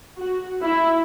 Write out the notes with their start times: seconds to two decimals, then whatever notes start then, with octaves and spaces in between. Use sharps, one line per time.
0.20 F#4
0.64 E4